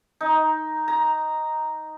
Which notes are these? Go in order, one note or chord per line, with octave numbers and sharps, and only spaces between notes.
D#4
A#5